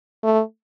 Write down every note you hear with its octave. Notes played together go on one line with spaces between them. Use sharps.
A3